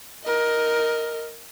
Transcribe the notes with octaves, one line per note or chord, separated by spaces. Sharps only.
A#4 D#5